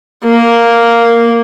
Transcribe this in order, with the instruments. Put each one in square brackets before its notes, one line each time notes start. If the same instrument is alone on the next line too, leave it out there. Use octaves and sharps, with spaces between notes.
[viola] A#3